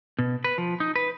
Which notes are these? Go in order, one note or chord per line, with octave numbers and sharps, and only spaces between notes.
B2
B4
F3
D#4
B4